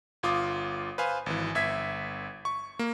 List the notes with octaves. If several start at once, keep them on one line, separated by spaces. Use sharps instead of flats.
G1 F4 D6 D#6
B4 C5 F5 G#5
G#1 E3
G1 E5 G#6 B6
C#6
A#3